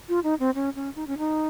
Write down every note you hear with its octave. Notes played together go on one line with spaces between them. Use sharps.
F4
D#4
C4
C#4
C#4
D#4
C#4
D#4